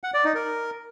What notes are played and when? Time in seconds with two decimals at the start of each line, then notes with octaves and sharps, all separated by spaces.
0.04 F#5
0.14 D5
0.24 D#4
0.35 A#4